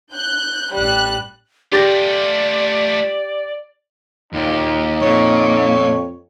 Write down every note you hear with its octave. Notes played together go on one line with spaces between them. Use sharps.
F#6 G6
A1 G3 F#6
A3 F4 G4 D5 A6 A#6
D#2 A#2 D#4
F2 A#2 C#5